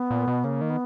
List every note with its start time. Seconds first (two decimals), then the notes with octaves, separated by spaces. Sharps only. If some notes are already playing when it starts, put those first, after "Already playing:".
Already playing: B3
0.11 A#2
0.27 B2
0.44 C#3 A#3
0.61 D#3
0.70 B3